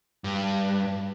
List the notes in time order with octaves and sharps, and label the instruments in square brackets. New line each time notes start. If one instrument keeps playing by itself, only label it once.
[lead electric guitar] G2